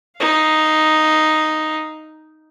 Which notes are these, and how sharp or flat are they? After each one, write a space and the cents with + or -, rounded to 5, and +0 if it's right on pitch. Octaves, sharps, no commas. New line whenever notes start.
D#4 +0 F5 +0